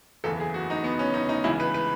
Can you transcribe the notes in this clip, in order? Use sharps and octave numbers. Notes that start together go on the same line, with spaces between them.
F#1 E2 C#3 E3 A4
G#4
F#4
D#4
B3
C#4
D#4
D#4
C#2 C#3 E3 E4
B4
B4